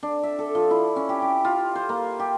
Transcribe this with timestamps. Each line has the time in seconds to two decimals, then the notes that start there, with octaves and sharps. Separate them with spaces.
0.03 D4
0.23 E5
0.39 A4
0.55 F3
0.71 E4
0.96 C#4
1.09 G4
1.22 D6
1.45 F4
1.75 C5
1.89 A#3
2.19 G4